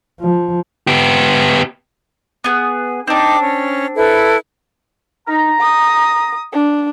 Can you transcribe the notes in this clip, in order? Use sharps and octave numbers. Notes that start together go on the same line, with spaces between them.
F3
B3 G4
B3 G#4
C4 D4 D#4 G5 D6
C#4
E4 A4 B4
D#4 A#5
D#6
D4